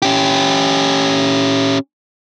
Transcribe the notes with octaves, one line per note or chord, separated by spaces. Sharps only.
C#4 G4